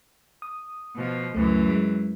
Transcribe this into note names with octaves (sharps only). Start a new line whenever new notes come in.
D#6
B2 F3
C#2 F#2 E3 A3
G#3